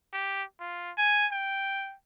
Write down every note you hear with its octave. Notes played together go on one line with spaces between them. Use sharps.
G4
F4
G#5
G5